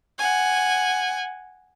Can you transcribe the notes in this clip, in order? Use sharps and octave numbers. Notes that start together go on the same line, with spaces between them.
F#5 G#5